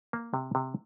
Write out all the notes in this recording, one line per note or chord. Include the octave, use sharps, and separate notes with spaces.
A#3
C3
C3